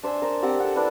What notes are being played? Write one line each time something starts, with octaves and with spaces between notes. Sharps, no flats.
D4 C5 E5 G#5
A#4 C5 D5
C4 G4 D5 F#5
A4 F#5
D4 E4 B4